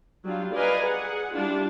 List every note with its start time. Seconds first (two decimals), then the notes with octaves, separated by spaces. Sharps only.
0.25 F#3 G3 D4 F4
0.54 B4 D5 D#5 F5 G#5 A#5
0.83 G#4 F#5
1.34 G3 D4 E4 F4